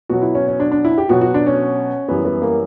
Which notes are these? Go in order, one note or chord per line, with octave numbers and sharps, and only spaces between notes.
B2 F#3 F#4
E4
C#4
C#4
D4
D4
E4
G4
B2 F#3 F#4
F#4
D4
C#4
F#2 E3 G3 B3
B3
A#3